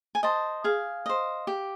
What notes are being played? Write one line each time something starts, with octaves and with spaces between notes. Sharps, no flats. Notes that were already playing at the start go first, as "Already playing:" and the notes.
G#5
C5 D#5 A5
G#4 F5
C5 D#5
G4